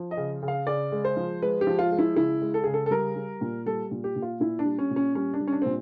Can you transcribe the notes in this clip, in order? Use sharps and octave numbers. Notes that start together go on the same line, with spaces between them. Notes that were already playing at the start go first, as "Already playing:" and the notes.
Already playing: F3
D#5
C#3
C#3
F5
C#3 D5
G#3
C5
F3
G#3 B4
G4
F3
F4
G#3
E4
C#3 E4
G#3
A4
C#3 G#4
A4
A4
G3 A#4
G3
A#2
G3 A4
A#2
G4
A#2
F4
A#2 E4
D4
G3
C#4
A#2
C#4
G3 C#4
D4
G3
C#4
D4
A#2 C4